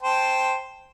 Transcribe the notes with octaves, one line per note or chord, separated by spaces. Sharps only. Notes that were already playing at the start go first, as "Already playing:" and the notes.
C5 G5 A5